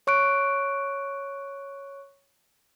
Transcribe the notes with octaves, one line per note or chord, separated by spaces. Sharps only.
C#5 C#6 F#6 D7